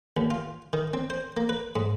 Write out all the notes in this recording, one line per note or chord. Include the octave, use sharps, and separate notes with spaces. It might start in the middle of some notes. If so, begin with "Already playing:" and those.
D#2
F4
D#3
C4
C5
A#3
B4
G#2